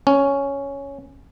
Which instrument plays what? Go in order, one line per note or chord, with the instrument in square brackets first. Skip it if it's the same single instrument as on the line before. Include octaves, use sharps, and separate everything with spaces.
[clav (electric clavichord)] C#4